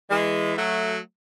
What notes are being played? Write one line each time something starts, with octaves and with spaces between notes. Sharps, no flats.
E3 G#3
F#3 A3